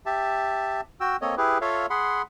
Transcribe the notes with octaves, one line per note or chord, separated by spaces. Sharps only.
G4 E5 A5
F#4 G5 E6
A#3 C4 A4 C#5 D#5
E4 G4 G#4 B4
F4 A4 C#5 E5 F5
G#4 F#5 B5 C6